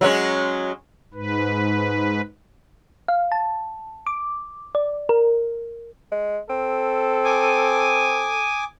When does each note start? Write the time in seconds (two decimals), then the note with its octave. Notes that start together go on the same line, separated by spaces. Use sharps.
0.01 F#3 G#3 C#4
1.14 G#2 B4
3.08 F5
3.32 A5
4.07 D6
4.75 D5
5.09 A#4
6.12 G#3
6.50 C4 A4
7.25 G#5 D6 D#6